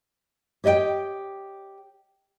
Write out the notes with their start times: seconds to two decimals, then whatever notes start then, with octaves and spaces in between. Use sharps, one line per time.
0.64 G4 C#5 D#5 E5 G5